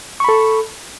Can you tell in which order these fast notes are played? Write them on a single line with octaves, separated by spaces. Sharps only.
C#6 B5 A4